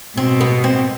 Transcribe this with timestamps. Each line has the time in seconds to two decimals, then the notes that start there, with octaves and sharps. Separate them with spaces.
0.16 B2 C4
0.41 B3
0.64 C4